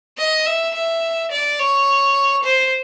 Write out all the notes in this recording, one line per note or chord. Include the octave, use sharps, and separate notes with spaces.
D#5
E5
E5
D5
C#5
C5